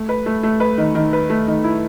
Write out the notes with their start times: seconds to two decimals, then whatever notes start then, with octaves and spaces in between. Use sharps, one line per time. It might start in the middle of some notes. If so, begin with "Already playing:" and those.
Already playing: A3
0.09 B4
0.26 A3
0.43 A3
0.60 B4
0.78 D#3
0.95 D#3
1.13 B4
1.30 A3
1.48 D#3
1.64 E4